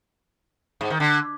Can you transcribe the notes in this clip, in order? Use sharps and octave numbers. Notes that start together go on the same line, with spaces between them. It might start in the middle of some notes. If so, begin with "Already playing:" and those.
G#2
D#3
D3